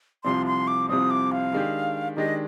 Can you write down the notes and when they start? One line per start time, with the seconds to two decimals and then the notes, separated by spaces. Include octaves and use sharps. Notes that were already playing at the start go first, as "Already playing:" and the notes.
0.24 C2 C3 F3 C4 C6
0.46 C6
0.67 D6
0.89 C2 C3 F3 C4 D#6
1.11 D6
1.32 F5
1.53 D#3 G#3 D4 G4
2.17 D#3 G#3 D4 G4 D#5